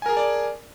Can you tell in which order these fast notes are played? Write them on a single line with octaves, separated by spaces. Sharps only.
G#5 A#4 G#4 A5 D5